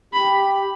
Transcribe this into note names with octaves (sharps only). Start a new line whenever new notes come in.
G4 B5